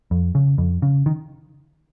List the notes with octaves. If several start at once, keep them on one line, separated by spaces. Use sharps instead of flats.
F2
C#3
F2
C#3
D#3